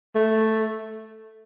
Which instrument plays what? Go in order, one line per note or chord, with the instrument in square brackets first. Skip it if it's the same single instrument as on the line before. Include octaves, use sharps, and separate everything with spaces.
[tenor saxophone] A3